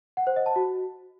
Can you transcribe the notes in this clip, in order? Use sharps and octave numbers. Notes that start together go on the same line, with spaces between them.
F#5
C5
D#5
A5
F#4